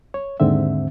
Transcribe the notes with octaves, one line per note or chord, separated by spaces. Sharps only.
C#5
D#2 G#2 D3 C4 E5